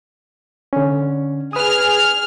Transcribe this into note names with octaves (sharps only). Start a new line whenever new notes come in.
D3 C#4
G#4 B4 D#6 F6